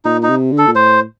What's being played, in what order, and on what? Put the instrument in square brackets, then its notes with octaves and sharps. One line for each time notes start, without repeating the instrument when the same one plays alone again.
[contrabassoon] A#2 [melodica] D#4
[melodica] D#4
[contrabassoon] C3
D3
[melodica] A4
[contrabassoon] A#2
[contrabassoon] A2 [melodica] C5